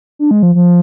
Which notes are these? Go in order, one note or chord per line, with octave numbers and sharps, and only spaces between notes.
D4
G#3
F3
F3